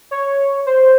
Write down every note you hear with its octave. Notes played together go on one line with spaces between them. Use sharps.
C#5
C5